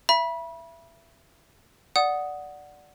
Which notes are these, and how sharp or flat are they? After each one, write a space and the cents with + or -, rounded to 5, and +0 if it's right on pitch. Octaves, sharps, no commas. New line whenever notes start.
E5 +25 B5 -30
D5 +0 F#5 +0 D#6 +0